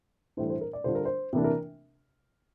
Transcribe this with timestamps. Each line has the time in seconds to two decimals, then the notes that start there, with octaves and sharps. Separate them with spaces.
0.37 A2 E3 G3 D4 C5
0.50 C5
0.61 A#4
0.73 D5
0.84 D3 G3 D4 F4 C5
0.95 A#4
1.05 C5
1.33 C3 E3 A#3 D4
1.44 A#4